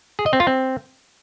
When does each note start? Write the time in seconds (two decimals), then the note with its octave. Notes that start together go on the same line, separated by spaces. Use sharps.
0.19 G#4
0.26 D#5
0.33 C4
0.40 F4
0.47 C4